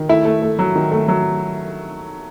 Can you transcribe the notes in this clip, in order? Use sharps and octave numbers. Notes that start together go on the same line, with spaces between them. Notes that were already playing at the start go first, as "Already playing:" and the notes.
Already playing: D#3
A3 E4
A3
A3
F#3
D#3
A3
F#3